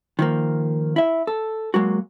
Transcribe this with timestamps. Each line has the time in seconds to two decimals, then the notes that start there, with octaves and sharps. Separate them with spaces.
0.19 D#3 F3 A#3
0.96 E4 E5
1.27 A4
1.74 F#3 G#3 A#3 F#4